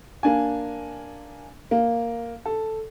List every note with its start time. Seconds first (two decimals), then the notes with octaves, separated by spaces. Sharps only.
0.23 A#3 D4 G#5
1.71 A#3
2.45 A4